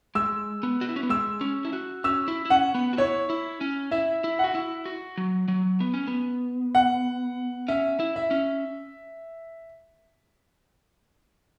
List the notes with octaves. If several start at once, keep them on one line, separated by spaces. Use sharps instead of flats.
G#3 E6
B3
F#4
E4
C#4
B3
G#3 E6
C#4
E4
F#4
C#4 E6
E4
E4
C#4 F#5
B3
F#4
E4 C#5
E4
C#4
E4 E5
E4
F#4 F#5
E4
F#4
F#3
F#3
B3
C#4
B3
F#5
C#4 E5
E4
E5
C#4